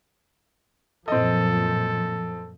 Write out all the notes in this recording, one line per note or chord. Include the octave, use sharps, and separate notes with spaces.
F#2 A#2 F3 C4 A4 D#5